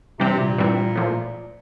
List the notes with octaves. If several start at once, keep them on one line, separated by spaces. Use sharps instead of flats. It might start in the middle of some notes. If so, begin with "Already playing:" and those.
G2 C3 E3 G3 C4
A#2
G2 E3 G3 C4
A2 F3 A#3